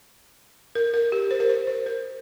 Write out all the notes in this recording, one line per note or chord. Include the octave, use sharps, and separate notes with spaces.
A#4
A#4
G4
C5
A#4
C5
C5
A#4